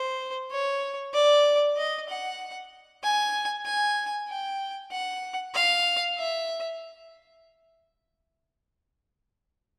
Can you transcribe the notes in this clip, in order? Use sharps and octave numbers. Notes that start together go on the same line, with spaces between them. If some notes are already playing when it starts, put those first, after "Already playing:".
Already playing: C5
C#5
D5
D#5
F#5
G#5
G#5
G5
F#5
F5
E5